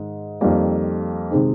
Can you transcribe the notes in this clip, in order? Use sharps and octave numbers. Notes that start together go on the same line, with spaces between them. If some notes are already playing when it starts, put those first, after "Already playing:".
Already playing: G#2 D#3 G#3
F2 D#3 G3 A#3
C3 D#3 G#3 C4 D#4